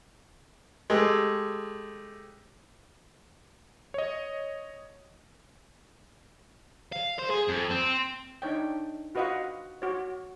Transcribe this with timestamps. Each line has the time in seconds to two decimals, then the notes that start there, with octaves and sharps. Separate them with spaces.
0.90 G#3 A3 G4
3.94 C#5 D#5
6.92 F5
7.18 C5
7.30 G#4
7.48 F2
7.70 C4
8.42 D4 D#4 C#5 G5
9.15 F4 F#4 B4 D#5 F5 F#5
9.82 F#4 C#5